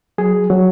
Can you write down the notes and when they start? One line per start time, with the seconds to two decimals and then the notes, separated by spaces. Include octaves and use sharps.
0.18 F#3 G#4
0.50 F#3